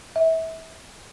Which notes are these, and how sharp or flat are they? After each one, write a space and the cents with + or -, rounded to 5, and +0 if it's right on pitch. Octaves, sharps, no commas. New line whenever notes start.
E5 -30